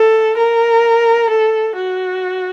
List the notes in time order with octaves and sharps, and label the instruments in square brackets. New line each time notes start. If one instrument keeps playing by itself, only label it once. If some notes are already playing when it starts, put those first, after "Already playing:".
Already playing: [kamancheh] A4
A#4
A4
F#4